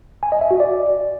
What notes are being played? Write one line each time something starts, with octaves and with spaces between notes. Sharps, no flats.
G#5
D#5
E5
F#4
D5